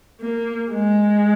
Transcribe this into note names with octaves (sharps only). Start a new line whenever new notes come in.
A#3
G#3